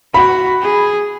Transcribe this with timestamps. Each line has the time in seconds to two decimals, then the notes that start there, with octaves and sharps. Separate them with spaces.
0.14 F#4 B5
0.62 G#4